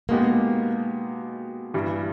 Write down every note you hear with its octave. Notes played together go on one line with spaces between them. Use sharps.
B2 G#3 A#3 B3 D#4 G4
G2 E3 G3